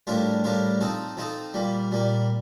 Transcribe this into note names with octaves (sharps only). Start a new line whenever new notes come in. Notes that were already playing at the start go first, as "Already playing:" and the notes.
A2 G3 D4 F4 A#4
A2 G3 D4 F4 A#4
F3 C4 D#4 A4
F3 C4 D#4 A4
A#2 G3 A#3
A#2 G3 A#3